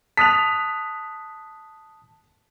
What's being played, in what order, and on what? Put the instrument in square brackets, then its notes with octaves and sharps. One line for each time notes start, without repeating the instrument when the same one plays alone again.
[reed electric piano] A5 D#6 F#6 [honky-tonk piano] B6 F7